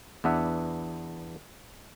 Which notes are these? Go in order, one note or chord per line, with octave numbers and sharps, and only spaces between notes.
E2 B3 D4 E5 F#5